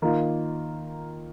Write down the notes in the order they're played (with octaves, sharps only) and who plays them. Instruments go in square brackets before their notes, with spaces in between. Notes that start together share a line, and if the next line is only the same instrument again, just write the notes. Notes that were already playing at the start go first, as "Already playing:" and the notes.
[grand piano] D#3 A#3 F4